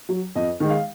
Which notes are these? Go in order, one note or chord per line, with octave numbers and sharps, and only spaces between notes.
F#3
F2 D#5
D#3 G#3
F5